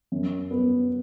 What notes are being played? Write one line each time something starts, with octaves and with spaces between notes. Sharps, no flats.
F#2
B3